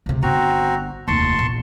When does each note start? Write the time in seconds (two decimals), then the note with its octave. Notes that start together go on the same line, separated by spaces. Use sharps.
0.06 C#2 C3
0.22 G1 C4 F#4 A#5
1.08 F1 D#2 A5 C6 C#6
1.39 A#1 E2